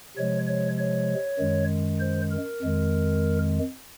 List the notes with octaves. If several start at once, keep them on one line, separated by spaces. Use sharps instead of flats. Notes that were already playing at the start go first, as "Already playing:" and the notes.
C3 F3 G#3 C#5
C#5
C#5
F#2 D#3 G#3
C5
A#4
F2 D#3 G#3